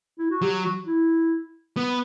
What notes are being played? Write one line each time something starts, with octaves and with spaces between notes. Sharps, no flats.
E4
F#4
F#3 G4
F#4
E4
B3